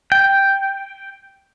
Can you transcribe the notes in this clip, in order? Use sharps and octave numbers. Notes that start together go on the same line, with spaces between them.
G5